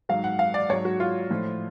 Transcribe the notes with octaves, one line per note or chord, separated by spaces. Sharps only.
G#2 F#3 F5
F#5
F5
D5
G#2 F#3 C#5
F#4
F4
A2 F3